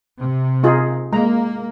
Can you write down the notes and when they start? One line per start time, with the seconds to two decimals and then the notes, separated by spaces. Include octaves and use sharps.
0.18 C3
0.63 D#4 F4 G#4
1.13 G#3 A#3 A#5